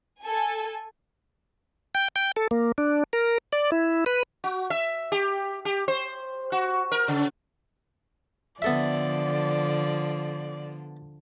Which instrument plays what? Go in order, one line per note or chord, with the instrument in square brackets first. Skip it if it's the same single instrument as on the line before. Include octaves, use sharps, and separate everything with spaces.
[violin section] A4 G#5
[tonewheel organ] G5
G5
A4
A#3
D4
A#4
D5
E4
B4
[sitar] F#4
E5
G4
G4
C5
F#4
A#4
C#3
[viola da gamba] D3 F3 [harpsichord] B3 A4 E5 [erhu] D5